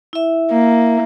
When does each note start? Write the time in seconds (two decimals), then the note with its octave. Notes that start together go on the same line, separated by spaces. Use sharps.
0.13 E4 E5
0.52 A#3